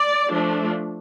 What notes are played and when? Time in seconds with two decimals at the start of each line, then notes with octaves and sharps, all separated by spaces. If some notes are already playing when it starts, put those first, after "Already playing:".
Already playing: D5
0.28 F3 A3 D4